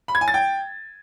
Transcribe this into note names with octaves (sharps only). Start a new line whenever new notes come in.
B5
G#6
G#5
A6
G5